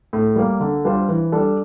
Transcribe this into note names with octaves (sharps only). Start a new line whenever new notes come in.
A2
G3 A#3
D3
G3 D4 F4 C5
E3
G3 D4 A4